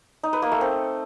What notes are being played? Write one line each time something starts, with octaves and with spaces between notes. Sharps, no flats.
D#4
B4
A#3
A3
C4